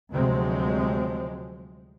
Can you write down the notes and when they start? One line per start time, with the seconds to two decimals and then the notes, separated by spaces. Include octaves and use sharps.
0.12 D2 C3 F3 F#3 G#3 C4